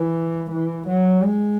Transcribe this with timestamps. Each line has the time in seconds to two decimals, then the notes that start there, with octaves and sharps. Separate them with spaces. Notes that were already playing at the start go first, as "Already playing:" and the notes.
Already playing: E3
0.51 E3
0.87 F#3
1.23 G#3